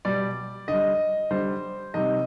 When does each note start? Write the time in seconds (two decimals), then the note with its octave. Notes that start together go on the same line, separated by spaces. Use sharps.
0.05 B2 G3 D5
0.68 D3 D#5
0.73 G3
1.31 D3 G3 C5
1.94 C3 D#3 G3 D#5